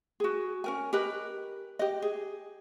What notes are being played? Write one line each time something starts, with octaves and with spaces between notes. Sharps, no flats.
F#4 G#4
C#4 A#4 G#5
G4 A#4 B4 D#5
G4 D#5
G#4